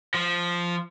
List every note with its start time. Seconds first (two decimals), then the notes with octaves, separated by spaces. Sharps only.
0.14 F3